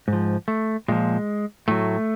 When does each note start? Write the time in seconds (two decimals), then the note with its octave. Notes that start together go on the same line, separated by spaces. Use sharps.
0.08 G#2
0.13 F3
0.48 A3
0.88 A#2 F3 G#3
1.68 A2 F#3 A3